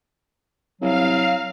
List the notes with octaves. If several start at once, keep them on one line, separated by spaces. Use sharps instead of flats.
C2 F#3 F5